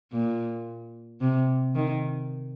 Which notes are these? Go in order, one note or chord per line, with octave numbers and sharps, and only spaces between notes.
A#2
C3
D#3